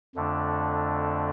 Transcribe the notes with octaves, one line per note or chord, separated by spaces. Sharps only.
F2 D3 A3 D4